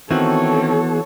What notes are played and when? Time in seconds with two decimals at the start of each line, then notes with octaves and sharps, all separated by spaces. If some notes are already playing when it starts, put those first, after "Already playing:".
0.11 D#3 E3 B3 C4 F#4 A4 C#5